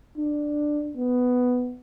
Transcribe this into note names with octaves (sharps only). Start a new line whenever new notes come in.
D4
B3